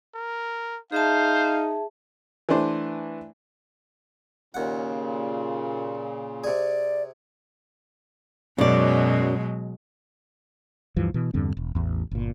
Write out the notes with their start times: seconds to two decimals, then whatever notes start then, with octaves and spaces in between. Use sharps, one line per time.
0.14 A#4
0.92 D#4 G#4 C5 E5 F5 A5
2.49 E3 A3 D4 C5
4.54 D#2 A#2 C#3 F#5
6.44 C3 G#4 D5
8.58 F#2 B2 F#3 G#3 D5
10.96 D2 G2 E3 F3
11.14 B2 E3
11.34 E2 G2 D3 C4
11.57 E1
11.75 A1 E2
12.11 G1 A#2